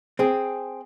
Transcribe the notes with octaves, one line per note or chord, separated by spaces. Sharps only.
C4 G#4